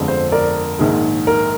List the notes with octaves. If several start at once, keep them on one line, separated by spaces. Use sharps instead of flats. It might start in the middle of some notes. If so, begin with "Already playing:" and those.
Already playing: G1 F2 D3 G#3
C5
A#4 D5
A#1 G#2 D#3 G#3
A#4